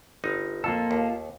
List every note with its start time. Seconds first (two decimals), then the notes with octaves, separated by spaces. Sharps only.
0.24 G1 D#4
0.64 F2 A#3 F4 A4
0.91 D#2